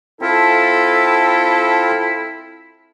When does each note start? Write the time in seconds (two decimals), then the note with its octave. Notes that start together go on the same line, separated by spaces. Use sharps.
0.22 C4 E4 F4 A4